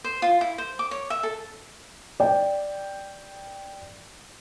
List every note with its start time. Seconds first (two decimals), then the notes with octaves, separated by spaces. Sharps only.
0.04 C5
0.22 F4
0.41 E4
0.58 C5
0.79 D6
0.91 C#5
1.10 E5
1.23 A4
2.20 D5 G5